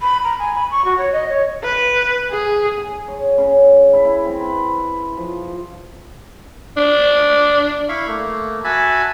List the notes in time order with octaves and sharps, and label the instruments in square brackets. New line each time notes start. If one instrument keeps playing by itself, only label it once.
[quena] B5
A#5
G#5
B5
C#6
F#4
C#5
D#5
C#5
[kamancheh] B4
G#4
[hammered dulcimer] G#4
C#5
C#3
E4
E4
C4
B4
F3
[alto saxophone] D4
[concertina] E4 F5 B5 C#6
A3 A#3
F#4 E5 G#5 A5 B5